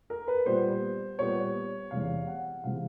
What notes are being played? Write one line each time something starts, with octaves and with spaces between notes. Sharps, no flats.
A#4
B4
A#2 G3 B3 C5
A#2 G3 B3 C#5
E2 C3 E3 G#3 F5
F#5
C3 E3 G#3 F5